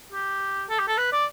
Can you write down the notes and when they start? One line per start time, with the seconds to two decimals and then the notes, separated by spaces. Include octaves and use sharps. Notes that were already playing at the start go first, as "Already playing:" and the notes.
0.12 G4
0.70 A4
0.79 G4
0.88 A4
0.98 B4
1.13 D5